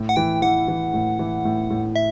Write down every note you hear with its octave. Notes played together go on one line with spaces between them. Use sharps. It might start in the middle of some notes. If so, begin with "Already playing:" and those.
Already playing: A2
F#5
E3 G5
E3 F#5
E3
A2
E3
A2
A2
E5